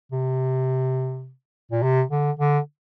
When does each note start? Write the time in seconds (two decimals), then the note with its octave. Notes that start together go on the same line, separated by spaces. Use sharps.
0.12 C3
1.72 A#2
1.83 C3
2.11 D3
2.39 D3